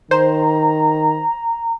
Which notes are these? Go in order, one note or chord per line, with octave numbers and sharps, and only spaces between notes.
D#3 C5 A#5